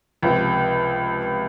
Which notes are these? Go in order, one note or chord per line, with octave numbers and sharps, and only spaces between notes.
C#2 C3 F3